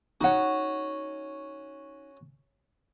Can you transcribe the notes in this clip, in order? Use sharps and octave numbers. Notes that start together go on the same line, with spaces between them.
C#4 D#4 F#4 F#5